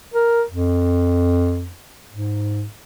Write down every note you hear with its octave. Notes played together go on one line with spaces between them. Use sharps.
A#4
F2
G#2